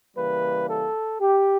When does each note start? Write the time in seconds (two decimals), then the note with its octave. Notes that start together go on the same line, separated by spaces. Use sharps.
0.16 C#3 E3 G3 A#3 B4
0.68 A4
1.21 G4